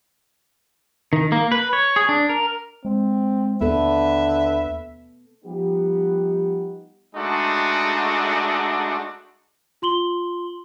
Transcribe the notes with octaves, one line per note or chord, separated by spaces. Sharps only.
D#3
A#3
B4
C#5
G#4
D4
A#4
G#3 C4
D#2 D3 B3 A4 B4 E5
F3 G3 B3 D#4 G4
G#3 A3 D4 D#4 F#4
F4 C6 F#7 G7